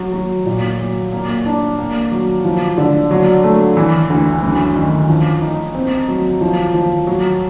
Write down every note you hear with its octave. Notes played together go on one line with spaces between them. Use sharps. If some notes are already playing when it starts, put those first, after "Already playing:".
Already playing: F#3
F#3
A#2
F#3
A#3
D4
A#3
F#3
F3
D3
F#3
A3
E3
D2
F#2
D#3
F3
D#4
C4
F#3
F3
F3
F#3